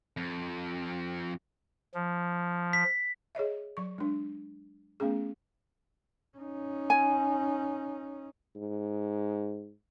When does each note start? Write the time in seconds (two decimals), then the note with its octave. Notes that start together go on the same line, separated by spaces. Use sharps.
0.17 F2
1.94 F3
2.73 B6
3.35 G#4 C#5 D#5 E5
3.77 F#3 C#6
3.98 G#3 D4
5.00 A3 B3 C#4 G#4
6.38 C#4 D#4
6.90 G#5
8.56 G#2